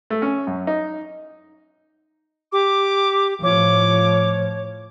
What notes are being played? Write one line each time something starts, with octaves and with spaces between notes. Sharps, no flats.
A3
C#4
F#2
D#4
G4 D6
A2 F3 C#5 D6